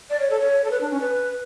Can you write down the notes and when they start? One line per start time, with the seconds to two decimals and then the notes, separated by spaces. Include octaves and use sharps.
0.10 D5
0.20 C#5
0.30 A4
0.40 C#5
0.64 A4
0.71 B4
0.81 D4
0.91 C#4
1.01 B4